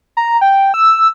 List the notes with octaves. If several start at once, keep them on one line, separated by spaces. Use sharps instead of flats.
A#5
G5
E6